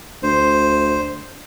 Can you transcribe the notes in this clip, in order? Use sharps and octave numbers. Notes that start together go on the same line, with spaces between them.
D2 C5